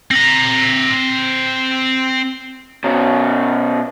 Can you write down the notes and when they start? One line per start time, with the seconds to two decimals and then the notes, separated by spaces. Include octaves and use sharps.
0.11 C4 A#5
2.84 B2 C#4